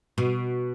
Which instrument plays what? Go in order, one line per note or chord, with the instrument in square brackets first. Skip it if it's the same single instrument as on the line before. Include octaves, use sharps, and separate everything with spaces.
[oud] B2